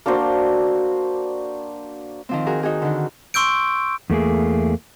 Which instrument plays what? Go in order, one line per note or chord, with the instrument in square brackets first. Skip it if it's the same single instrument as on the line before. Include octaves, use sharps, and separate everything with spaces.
[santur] A#3 D4 F#4 C5
[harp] D#3 F3 C4
F#4 G#4 A#4
D#4 F#4 G#4
D3 D#3
[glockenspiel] C6 C#6 E6 G6 D7
[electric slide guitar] E2 A3 A#3 G#4